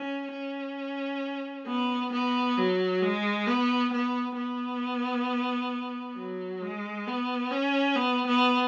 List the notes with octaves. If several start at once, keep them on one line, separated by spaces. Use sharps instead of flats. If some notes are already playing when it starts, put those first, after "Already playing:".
Already playing: C#4
C#4
B3
B3
F#3
G#3
B3
B3
B3
F#3
G#3
B3
C#4
B3
B3